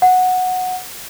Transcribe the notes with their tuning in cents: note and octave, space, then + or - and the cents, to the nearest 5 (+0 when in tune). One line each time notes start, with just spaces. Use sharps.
F#5 -10